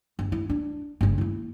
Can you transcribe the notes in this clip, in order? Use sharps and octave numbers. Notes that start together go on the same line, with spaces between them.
G1
E4
D4
G1 C#2
A#3 E4